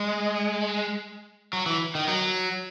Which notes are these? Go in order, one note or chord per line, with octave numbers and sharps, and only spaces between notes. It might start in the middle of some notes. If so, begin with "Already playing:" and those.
Already playing: G#3
F#3
E3
D#3
F#3